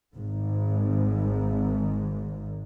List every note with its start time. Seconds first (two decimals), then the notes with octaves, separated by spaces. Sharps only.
0.15 G#1 G#2